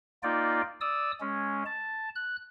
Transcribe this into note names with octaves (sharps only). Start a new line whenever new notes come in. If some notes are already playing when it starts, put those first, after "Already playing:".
A#3 D#4 F4 D5 G5
D5 D#6 E6
G#3 C#4
A5
F#6